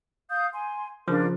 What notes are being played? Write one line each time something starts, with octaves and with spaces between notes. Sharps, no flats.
F5 D#6 G6
G#5 C6
C#3 F3 D4 F4 A#4